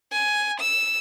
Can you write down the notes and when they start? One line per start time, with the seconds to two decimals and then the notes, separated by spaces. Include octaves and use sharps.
0.12 G#5
0.60 E6